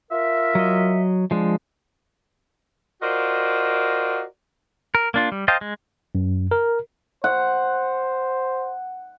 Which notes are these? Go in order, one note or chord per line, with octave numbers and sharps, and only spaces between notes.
F4 A#4 E5
F#3 D#5
F3 G#3 D4
F4 F#4 A#4 C5 D5 D#5
A#4
A#3 D4 F4
G3
C5 D#5 F5 G5 A5
G#3
F#2
A#4
C5 F#5